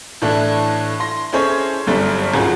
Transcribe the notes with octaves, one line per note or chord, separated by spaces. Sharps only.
A2 E3 D4 E4 A4
C6 A#6
C#4 E4 G#4 A4 C5 C#5
G1 F#2 G3 A4 E5
G#1 C#2 F#4 G#4